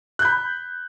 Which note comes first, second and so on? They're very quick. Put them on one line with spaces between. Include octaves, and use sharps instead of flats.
F#6 G6 B5